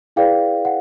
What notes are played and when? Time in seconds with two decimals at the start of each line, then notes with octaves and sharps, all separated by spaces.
0.16 E4 G#4 B4 D5 F5 G5
0.65 F#5